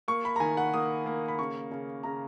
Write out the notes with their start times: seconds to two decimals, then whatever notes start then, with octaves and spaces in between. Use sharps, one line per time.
0.08 A#3 C#6
0.25 B5
0.36 A#5
0.40 D#3 G#5
0.57 F#5
0.74 A#3 D#6
1.06 A#3
1.28 B5
1.39 C#3 C#6
1.71 C#3
2.03 C#3 A#5